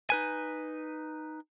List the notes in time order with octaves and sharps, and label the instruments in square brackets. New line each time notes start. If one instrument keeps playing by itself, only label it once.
[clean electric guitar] D#4 B4 G#5